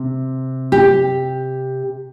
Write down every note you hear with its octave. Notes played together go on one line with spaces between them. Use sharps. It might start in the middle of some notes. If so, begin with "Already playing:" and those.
Already playing: C3
G4